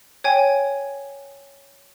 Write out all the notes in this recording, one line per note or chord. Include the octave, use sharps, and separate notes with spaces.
C#5 G5 G#5